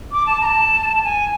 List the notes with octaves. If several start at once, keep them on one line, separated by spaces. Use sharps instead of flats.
D6
A5
A#5
A5
A5
G#5